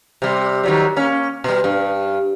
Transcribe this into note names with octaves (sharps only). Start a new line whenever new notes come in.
C3 G3
D#3 F#3 G3
A#3 C#4
B2 G3
G2